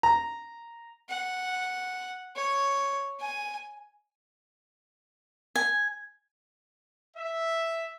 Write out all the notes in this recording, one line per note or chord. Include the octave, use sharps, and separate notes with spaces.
A#5
F#5
C#5
G#5
G#5
E5